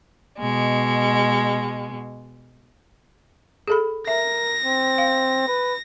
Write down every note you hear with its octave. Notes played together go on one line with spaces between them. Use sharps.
B2 G#3
G#4 A4 B5
A#4 E5 A#6
C4
F5
B4